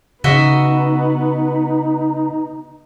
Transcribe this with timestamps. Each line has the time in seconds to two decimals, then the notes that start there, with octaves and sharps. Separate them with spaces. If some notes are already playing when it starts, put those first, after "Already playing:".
0.24 C#3 B3 D#4 F#4 D#5 E5